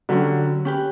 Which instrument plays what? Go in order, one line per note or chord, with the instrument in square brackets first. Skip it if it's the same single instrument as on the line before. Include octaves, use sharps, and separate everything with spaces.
[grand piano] D3 F#3 [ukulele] C#4 G4 B4
[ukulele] C#4 G4 B4